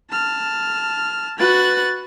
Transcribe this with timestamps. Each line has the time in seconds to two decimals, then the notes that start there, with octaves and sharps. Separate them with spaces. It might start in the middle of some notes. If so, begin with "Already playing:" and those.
0.11 A5 F6
1.39 F#4 B4 F#6 A6